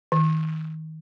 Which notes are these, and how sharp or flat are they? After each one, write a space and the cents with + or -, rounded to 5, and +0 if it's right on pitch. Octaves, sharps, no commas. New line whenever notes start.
D#3 +30